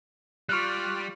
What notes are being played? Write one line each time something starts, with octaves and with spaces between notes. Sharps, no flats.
G3 F4 D5 C#6 F6 F#6